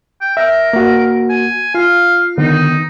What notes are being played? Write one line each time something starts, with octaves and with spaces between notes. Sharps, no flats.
G5
A#4 E5
A#3 F#4
G#5
F4 F5
D3 D#3 B3 D#4